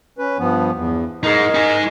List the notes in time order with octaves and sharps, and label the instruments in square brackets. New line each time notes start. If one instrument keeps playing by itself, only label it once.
[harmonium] C#4 B4
G2 F3 B3
E2
[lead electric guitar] D#4 G#4 [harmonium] A#4 D#5
[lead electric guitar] D#4 G#5